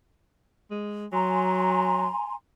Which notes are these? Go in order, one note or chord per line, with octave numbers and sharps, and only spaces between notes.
G#3
F#3 G#5 A#5 C6